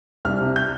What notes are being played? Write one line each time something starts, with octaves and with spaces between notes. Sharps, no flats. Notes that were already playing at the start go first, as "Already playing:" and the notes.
C2 F6
C3
G6